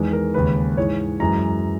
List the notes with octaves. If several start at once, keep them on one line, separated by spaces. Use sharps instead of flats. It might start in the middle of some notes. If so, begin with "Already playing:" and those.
Already playing: E2 D#3 G#3
A#4
D#2 C#3 G#3 B4
G#2 E3 G#3 C#5
F#2 E3 G#3 A#5